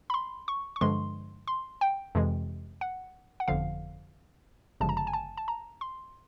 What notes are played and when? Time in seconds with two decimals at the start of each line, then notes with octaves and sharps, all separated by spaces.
0.10 B5
0.14 C6
0.48 C#6
0.76 C#6
0.81 G2 D3 F3 G#3 C6
1.48 C6
1.81 G5
2.15 F2 C3 E3 G#3
2.81 F#5
3.40 F#5
3.48 G1 F2 D3 F3 F5
4.80 G1 F#2 C#3 F3 G#3 A5
4.89 A#5
4.97 A5
5.07 G#5
5.13 A5
5.37 A5
5.48 A#5
5.81 C6